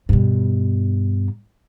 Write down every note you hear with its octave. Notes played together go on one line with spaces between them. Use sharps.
G2 B2